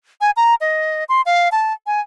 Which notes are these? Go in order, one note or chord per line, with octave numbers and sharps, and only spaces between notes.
G#5
A#5
D#5
C6
F5
A5
G#5